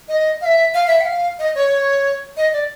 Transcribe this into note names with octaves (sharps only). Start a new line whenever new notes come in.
D#5
F5
E5
F5
E5
G5
F5
D#5
C#5
D#5
D5